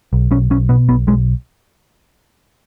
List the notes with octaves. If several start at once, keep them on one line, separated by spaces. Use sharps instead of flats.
B1
B1 C#4
B1 C#4
B2 B3
B1 B3
B1 G#3